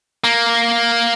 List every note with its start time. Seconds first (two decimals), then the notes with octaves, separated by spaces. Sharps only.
0.24 A#3